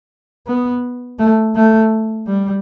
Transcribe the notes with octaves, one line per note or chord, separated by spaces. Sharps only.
B3
A3
A3
G3